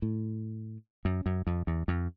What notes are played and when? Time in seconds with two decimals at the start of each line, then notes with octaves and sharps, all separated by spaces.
0.02 A2
1.05 F#2
1.26 F#2
1.47 F2
1.67 E2
1.88 F2